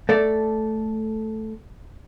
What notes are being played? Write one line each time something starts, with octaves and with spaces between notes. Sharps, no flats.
A3 A4 D5